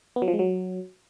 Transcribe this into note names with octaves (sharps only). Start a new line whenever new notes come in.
B3
F#3
F3
G#3
F#3